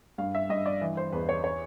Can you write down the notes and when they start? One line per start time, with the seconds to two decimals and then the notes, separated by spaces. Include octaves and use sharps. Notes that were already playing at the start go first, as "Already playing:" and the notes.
0.18 G2 F5
0.35 E5
0.49 G2 D#5
0.66 D5
0.81 E3
0.97 C5
1.12 E2 B4
1.29 C#5
1.44 C#5